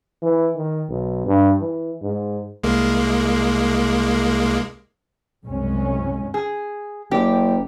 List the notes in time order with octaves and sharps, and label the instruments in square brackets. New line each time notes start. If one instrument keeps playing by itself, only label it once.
[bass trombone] E3
D#3
B1
G2
E3
G#2
[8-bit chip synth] C2 G#3 A#3
[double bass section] C2 F#2 C#3 G#3 C#4
[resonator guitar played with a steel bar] G#4
[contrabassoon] F#1 [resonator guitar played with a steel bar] G4